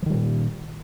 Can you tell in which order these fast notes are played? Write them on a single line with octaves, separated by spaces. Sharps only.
F3 D#3 G3 A#2